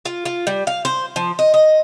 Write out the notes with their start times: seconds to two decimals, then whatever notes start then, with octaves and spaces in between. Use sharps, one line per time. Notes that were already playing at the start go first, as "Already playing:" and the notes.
0.05 F4
0.25 F4
0.47 G3
0.67 F5
0.85 C5
1.16 F3
1.39 D#5
1.54 D#5